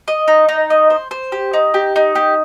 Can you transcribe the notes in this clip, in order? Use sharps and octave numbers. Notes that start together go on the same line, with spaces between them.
D#5
D#4
D#4
D#5
C5
C5
G4
D#4
G4
D#4
G4